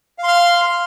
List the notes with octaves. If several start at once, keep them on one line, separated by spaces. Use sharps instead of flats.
F5 C6 F6